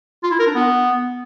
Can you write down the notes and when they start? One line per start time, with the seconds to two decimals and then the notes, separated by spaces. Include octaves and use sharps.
0.23 F4
0.31 E4
0.39 A#4
0.47 D4
0.55 B3